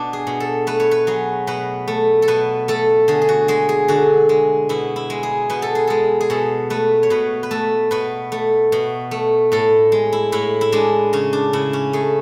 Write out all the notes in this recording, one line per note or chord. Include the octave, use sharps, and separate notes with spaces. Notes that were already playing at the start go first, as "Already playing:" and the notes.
Already playing: B2 D4
G#4
B2
A4
A3 B4
C#5
B4
F#3 G#4
B2 B4
A3
A4
B2 B4
A3 A4
D3 G#4
G#4
F#4
G#3 G#4
G#4
D3 F#4
G#3
B2 E4
E4
G#3
G#4
B2 B4
A4
G#4
G#3 A4
G#4
B2 A4
A3 B4
C#5
B2 B4
B4
A3 A4
B2 B4
A3
B2
A3
A2 A4
G#3
E4
A2 E4
E4
G#3 D4
C#3 C#4
D4
C#3 E4
C#4
A3 G#4